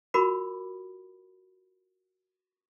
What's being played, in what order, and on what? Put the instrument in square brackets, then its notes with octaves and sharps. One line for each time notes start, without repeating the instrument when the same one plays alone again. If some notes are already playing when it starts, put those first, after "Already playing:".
[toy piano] F4 F#4 A#4 B5 D6